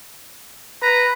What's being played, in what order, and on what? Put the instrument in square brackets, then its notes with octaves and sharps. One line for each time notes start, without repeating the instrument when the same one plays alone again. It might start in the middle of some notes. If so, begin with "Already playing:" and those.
[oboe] B4 [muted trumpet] A#5